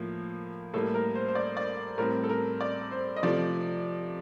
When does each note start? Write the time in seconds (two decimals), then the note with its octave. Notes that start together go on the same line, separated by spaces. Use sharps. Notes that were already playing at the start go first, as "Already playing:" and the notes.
Already playing: A2 F3 A#3
0.74 A2 G3 A#3 A4
0.94 A#4
1.15 C5
1.28 C5
1.35 D5
1.57 D5
1.98 A2 G3 C4 A#4
2.24 A4
2.29 A#4
2.61 D5
2.92 C5
3.16 D#5
3.23 C3 F3 A3 D5